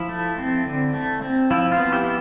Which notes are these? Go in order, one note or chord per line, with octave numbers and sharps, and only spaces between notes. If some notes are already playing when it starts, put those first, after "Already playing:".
Already playing: F3 E4
A3
C4
D3
A3
C4
F3 E4
F4
B3
E4 G4